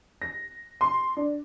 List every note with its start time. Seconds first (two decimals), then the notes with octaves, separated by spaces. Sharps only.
0.22 A#6
0.81 C6
1.17 D4